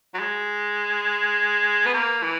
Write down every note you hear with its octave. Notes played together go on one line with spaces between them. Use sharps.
F#3
G#3
B3
A#3
E3